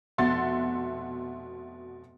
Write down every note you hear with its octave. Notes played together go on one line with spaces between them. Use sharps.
F1 B2 E5 F#5 C6 A6